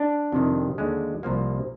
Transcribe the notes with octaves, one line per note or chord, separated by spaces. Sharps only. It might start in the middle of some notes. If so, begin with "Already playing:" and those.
Already playing: D4
F2 C3 D#3
D#2 D3 G#3
C2 C3 F3 A#3